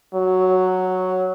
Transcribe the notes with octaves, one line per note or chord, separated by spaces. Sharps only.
F#3